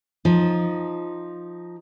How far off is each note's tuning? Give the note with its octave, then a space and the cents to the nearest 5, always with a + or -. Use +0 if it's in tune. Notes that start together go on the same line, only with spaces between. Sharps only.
F3 +0 D#4 +0